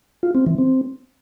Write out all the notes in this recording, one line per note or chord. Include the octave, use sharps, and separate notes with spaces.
F4
C4
E3
C4